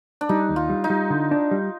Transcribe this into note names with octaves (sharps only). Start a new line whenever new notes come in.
D4
G3 D#4
D#2
F4
G3
D#4
G3
D3
D4
G3